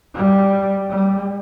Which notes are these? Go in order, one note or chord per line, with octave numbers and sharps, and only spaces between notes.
G3
G3